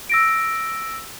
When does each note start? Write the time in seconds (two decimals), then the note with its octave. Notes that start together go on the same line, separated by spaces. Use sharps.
0.09 E6 A#6 D7